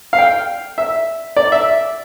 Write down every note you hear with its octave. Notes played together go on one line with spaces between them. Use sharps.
F5
G5
E5
D5
E5